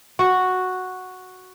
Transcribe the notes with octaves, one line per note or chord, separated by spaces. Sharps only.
F#4